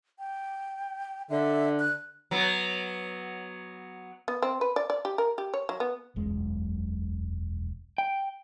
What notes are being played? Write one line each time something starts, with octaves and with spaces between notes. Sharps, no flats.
G5
D3 E5
F#6
F#3 B3
B3
C4
B4
D5
D5
G4
A#4
G4
C#5
F#3
B3
E1 B1 F#2 G#3
G5